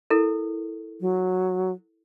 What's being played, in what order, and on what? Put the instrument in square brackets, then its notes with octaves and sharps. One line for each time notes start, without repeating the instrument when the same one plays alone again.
[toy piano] E4 A4 A#4
[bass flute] F#3